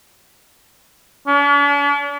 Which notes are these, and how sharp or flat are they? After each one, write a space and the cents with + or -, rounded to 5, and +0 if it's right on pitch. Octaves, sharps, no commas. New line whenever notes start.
D4 -45